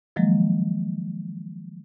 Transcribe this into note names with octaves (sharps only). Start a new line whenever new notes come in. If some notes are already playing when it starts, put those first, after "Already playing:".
D#3 F3 F#3 G#3 A#3